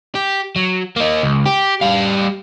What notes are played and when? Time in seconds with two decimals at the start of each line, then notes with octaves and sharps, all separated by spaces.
0.15 G4
0.56 F#3
0.96 A#3 D#4
1.23 C#2
1.46 G4
1.81 G3 F5